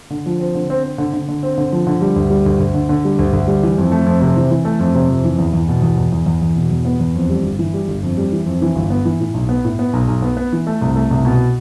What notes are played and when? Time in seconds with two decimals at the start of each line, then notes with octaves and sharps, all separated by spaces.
0.10 D3
0.26 F3
0.40 C4
0.55 D3
0.70 C4
0.83 C4
0.98 D3
1.13 D3
1.28 D3
1.43 C4
1.58 D3
1.72 F3
1.87 D3
2.01 G3
2.16 D2
2.30 G3
2.46 D2
2.60 D2
2.74 D3
2.89 D3
3.05 G3
3.19 D2
3.33 D2
3.47 G3
3.63 E3
3.78 F2
3.91 A3
4.06 F2
4.21 C3
4.37 E3
4.51 E3
4.65 A3
4.79 F2
4.95 C3
5.09 F2
5.24 E3
5.38 E2
5.53 E2
5.68 B2
5.82 E2
5.97 E2
6.12 E2
6.26 E2
6.41 E2
6.56 B2
6.71 E2
6.85 B3
7.00 E2
7.15 F2
7.30 G3
7.43 G1
7.59 E3
7.74 G3
7.88 G1
8.03 F2
8.17 G3
8.32 E3
8.46 F2
8.62 E3
8.76 G1
8.90 B3
9.05 E3
9.20 A2
9.34 B1
9.49 B3
9.64 A2
9.79 B3
9.93 B1
10.08 B1
10.22 B3
10.37 B3
10.53 E3
10.67 A3
10.82 C2
10.96 A3
11.11 C2
11.25 B2